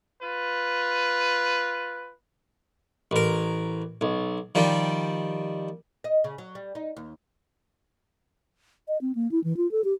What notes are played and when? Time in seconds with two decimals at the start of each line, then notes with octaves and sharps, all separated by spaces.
0.21 F4 B4
3.11 A1 A#4
4.01 B1
4.55 D#3 F3 G3
6.04 D#5
6.24 C#3
6.38 F#3
6.55 G3
6.75 D#4
6.97 D#2
8.88 D#5
9.01 C4
9.15 A#3
9.31 E4
9.44 E3
9.57 F4
9.71 A4
9.84 G4